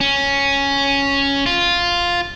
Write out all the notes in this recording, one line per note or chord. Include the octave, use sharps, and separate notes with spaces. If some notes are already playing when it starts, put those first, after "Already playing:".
C#4
F4